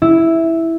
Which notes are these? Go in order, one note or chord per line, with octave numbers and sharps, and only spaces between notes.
E4